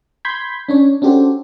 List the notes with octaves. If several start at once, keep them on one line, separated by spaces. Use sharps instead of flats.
B5 C6 G6 G#6 B6
C#4 D4 C#5
C#4 D4 F#4 G4 A4 C5